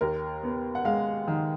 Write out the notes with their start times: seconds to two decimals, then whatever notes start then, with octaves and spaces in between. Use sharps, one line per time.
0.01 D#2 A#4
0.43 B3
0.75 F#5
0.85 G#3 F5
1.28 D#3